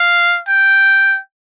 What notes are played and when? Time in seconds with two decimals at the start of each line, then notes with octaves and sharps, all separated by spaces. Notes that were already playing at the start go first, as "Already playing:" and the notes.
Already playing: F5
0.48 G5